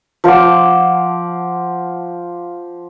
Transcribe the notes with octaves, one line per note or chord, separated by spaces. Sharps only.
F3 F5 F#5 D6